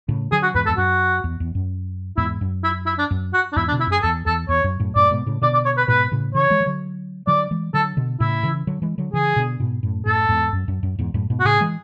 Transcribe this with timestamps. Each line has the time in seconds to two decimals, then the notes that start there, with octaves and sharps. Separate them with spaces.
0.09 A2 C#3
0.32 D3 F#3 G#4
0.43 F#4
0.55 E2 G#2 B4
0.66 A4
0.69 E2
0.78 F#2 F#4
1.24 E2
1.40 E2
1.55 F#2
2.17 E2 G#2 E4
2.41 F#2
2.64 E4
2.86 E4
2.99 D4
3.11 F#2
3.34 F#4
3.53 D4
3.56 E2 G#2 E4
3.68 D4
3.72 B2 D3
3.80 E4
3.87 F#2 G#4
4.03 E2 A4
4.26 E2 A4
4.49 E2 C#5
4.64 F#2
4.80 F#2 A2
4.95 F#2 A2 D5
5.11 G#2 B2
5.26 A2 C#3
5.42 B2 D3 D5
5.54 D5
5.65 C#5
5.77 B4
5.88 G#2 B2 B4
6.12 A2 C#3
6.35 C#3 E3 C#5
6.50 E3 G#3
6.60 E3
6.66 D3 F#3
7.27 D3 F#3 D5
7.51 E3 G#3
7.74 D3 F#3 A4
7.97 B2 D3
8.20 A2 C#3 E4
8.43 C#3 E3
8.67 D3 F#3
8.82 E3 G#3
8.98 D3 F#3
9.13 C#3 E3 G#4
9.36 B2 D3
9.60 G#2 B2
9.83 F#2 A2
10.06 F#2 A2 A4
10.29 E2 G#2
10.53 F#2
10.68 F#2
10.83 F#2
10.99 E2 G#2
11.14 F#2 A2
11.30 G#2 B2
11.40 F#4
11.45 A2 C#3 G#4
11.61 E3 G#3